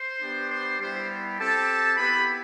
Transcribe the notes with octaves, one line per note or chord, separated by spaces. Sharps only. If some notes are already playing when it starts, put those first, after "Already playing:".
Already playing: C5 C6
B3 D4 G4
C5 C6
G3 B3 E4 G4 C5 C6
C4 G4 A4 A5
B3 E4 G4 B4 B5